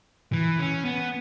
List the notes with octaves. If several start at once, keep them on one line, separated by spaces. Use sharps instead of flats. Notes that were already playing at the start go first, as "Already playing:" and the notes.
E3
C#4
B3